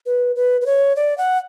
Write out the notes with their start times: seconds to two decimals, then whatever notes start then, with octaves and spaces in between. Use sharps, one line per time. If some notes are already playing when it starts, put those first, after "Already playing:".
0.06 B4
0.36 B4
0.61 B4
0.66 C#5
0.96 D5
1.18 F#5